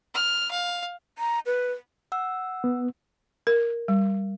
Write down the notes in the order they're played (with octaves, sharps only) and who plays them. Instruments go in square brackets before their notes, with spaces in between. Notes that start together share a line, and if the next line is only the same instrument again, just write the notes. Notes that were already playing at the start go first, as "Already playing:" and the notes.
[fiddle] F6
F5
[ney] A#5
B4
[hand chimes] F#5 E6
[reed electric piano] B3
[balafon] A#4
G3